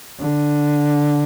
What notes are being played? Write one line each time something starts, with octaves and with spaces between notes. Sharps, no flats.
D3